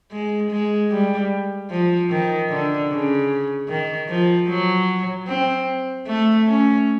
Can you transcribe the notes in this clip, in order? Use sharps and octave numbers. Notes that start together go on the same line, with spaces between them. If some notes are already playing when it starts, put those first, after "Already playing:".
G#3
G#3
G3
F3
D#3
D3
C#3
D#3
F3
F#3
C4
A3
C#4